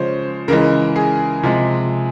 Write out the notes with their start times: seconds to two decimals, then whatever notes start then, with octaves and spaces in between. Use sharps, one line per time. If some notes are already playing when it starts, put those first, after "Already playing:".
Already playing: C#3 F3 G#3 C5 C#5
0.48 C#3 E3 G#3 A#4
0.96 G#4
1.43 C3 F3 G#3